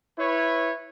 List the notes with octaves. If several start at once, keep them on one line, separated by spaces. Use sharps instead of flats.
E4 B4 C#5